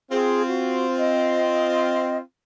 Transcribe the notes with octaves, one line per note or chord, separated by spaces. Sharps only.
C4 F4 G#4
F#4
D#5